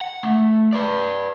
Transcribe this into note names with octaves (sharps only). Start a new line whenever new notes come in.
F#5
A3
B4 D5